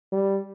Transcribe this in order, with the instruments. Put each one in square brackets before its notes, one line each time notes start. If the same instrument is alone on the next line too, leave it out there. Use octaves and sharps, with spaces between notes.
[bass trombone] G3